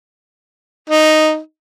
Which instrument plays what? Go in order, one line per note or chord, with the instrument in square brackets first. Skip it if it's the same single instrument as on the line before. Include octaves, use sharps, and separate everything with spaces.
[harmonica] D#4